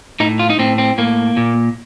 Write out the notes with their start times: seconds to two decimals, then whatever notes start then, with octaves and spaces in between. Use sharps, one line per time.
0.20 A2 D#4
0.39 F4
0.50 D#4
0.59 A2 C4
0.78 C4
0.98 A2 A#3
1.37 A#2